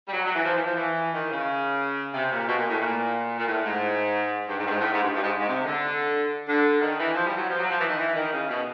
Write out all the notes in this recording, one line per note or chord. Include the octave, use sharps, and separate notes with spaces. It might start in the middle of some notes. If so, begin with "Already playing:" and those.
G3
F#3
F#3
E3
F3
E3
F3
E3
D#3
C#3
C3
A#2
B2
A#2
A2
A#2
A#2
A2
G#2
G2
G#2
G2
G#2
A2
G#2
G2
G2
G#2
G#2
C3
D3
D3
D#3
E3
F3
G3
F#3
F3
F#3
F3
E3
D#3
E3
D#3
C#3
B2